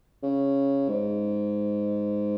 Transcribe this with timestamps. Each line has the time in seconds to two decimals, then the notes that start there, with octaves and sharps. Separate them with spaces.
0.23 C#3
0.89 G#2